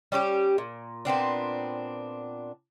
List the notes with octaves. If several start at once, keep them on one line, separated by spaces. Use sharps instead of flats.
G3 C#4 F#4 G4
A#2
A#2 B3 C4 D4